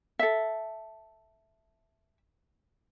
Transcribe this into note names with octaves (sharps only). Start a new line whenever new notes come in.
A4 E5